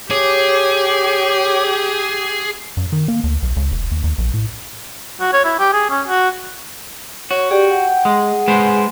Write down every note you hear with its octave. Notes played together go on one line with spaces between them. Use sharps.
G4 G#4 C#5 D6
F#2
D#3
A#3
D2
B1
C#2
E1
D#2
D#2
A#1
A2
F#4
C#5
E4
G4
G#4
C#4
F#4
F#4 C#5
G4 G#4 D5 G5
F#5
G#3 G#4
G#3 B4 C5